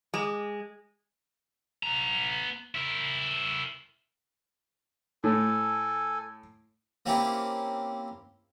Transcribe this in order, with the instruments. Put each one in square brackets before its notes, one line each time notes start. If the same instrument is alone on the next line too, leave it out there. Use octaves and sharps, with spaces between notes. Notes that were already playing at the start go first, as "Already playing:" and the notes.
[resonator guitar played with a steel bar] G#3
[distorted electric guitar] B3 A#5
E4 A#4
[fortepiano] A2 [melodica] A4 G#5
[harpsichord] A#3 C4 C#4 E4 G4